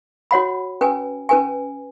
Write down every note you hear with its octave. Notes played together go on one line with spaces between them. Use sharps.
F#4 C#5 F#5 B5
C#4 B4 G#5
C#4 B4 G#5